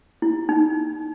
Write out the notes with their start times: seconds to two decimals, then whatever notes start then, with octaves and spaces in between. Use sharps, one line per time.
0.22 E4
0.49 D#4